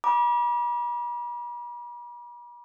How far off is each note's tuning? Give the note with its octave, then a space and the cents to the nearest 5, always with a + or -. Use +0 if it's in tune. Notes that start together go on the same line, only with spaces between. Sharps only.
B5 -45 D6 +0